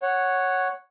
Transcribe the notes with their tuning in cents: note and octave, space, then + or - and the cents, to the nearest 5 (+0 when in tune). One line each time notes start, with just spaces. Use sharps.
C#5 -5 F#5 +0